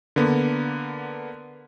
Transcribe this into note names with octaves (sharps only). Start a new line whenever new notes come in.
D3 A#3 B3